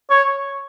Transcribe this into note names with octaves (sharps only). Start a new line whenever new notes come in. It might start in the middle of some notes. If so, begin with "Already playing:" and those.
C#5